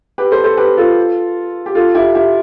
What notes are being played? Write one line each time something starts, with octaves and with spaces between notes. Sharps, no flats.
G4 B4
A4 C5
A4 C5
G4 B4
F4 A4
G4
F4 A4
E4 G4
E4 G4